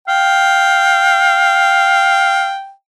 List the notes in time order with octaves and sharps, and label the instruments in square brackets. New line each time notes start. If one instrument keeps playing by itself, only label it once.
[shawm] F5 [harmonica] G5